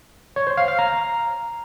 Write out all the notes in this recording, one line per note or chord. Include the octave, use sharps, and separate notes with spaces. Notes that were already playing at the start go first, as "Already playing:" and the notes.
C#5
C5
F5
F5
A#5